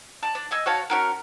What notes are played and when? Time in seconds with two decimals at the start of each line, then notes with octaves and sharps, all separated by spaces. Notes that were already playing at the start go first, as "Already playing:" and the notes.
0.23 D5 A5
0.35 D4
0.51 D#5 G#5 E6
0.66 F#4 C#5 F5 A5
0.90 C#4 F#4 A#4